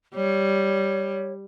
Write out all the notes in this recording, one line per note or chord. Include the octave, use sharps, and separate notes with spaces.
G3 C#5